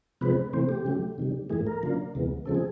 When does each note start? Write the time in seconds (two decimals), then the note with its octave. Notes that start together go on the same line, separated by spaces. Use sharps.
0.21 C3 F3 G#3 C4 B4
0.53 C3 E3 A3 C4 C5
0.69 G4
0.85 C#3 F#3 A3
1.18 C3 D#3 G3
1.50 G#2 E3 A3 G#4
1.67 A#4
1.83 C#3 F#3 A#3 D4 F4
2.15 D2 C3 E3 G#3 B3
2.46 C#3 F3 G#3 C4 A4
2.55 G#4